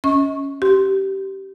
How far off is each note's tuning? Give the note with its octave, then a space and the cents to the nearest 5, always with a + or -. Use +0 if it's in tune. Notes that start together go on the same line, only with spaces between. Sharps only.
C#4 +0 D#5 +35 C#6 -20
G4 -20 C6 +0